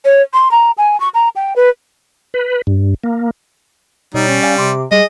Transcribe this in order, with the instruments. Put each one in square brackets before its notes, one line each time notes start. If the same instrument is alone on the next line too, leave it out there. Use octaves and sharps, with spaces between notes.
[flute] C#5
C6
A#5
G#5
C#6
A#5
G5
B4
[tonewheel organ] B4
G2
A#3
[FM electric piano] B2 C#5 [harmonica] G3 [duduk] D#4
[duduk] C#4
[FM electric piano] D5 F5 G#5
[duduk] C3 [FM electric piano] C6 D6
[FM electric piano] G3 [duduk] G#4 [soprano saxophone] D#5